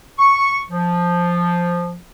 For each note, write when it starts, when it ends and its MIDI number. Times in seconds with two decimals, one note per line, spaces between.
0.19 0.58 85
0.71 1.98 53